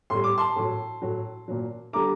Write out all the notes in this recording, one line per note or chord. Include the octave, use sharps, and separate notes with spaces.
A2 G3 C6
D6
A5 C6
A2 F#3
A2 F#3
A#2 F#3
D3 G3 A#5 D6